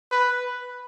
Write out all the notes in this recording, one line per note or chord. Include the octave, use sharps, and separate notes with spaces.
B4